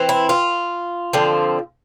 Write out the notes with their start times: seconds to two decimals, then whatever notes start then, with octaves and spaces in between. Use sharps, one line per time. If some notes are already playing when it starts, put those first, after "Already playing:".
Already playing: E3 C4
0.09 E4
0.29 F4
1.13 D3 F3 C4